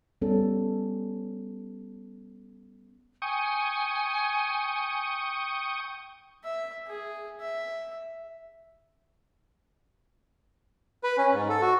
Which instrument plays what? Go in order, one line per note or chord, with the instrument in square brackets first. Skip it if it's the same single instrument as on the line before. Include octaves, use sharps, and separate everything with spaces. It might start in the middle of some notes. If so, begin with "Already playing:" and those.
[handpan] G3 B3 C#4 A4
[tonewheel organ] G5 C#6 D#6 [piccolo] G#5
[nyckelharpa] E5
G#4
E5
[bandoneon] B4
C#4
G#2
A4
F#4